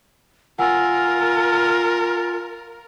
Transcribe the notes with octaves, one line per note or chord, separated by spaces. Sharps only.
F4 A#4 F#5 G#5 E6